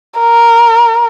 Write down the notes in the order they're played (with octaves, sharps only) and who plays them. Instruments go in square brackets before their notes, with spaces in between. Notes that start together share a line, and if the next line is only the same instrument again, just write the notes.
[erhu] A#4